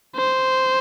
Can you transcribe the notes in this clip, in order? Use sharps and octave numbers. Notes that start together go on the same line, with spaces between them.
C5